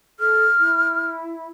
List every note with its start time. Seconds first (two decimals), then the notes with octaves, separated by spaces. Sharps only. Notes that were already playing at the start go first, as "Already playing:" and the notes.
0.20 A4 F6
0.59 E4